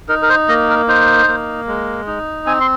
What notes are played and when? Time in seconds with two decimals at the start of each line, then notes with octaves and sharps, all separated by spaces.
0.09 D#4 A#4
0.22 A#4
0.29 C5
0.48 A#3 D#5
0.69 A#4
0.88 D#4 C5
1.28 A#3
1.67 G#3
2.07 D#4
2.46 C4 G#5
2.61 C6